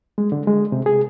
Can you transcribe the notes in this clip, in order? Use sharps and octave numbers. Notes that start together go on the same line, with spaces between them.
G#3
D3
G#3
C3
G#4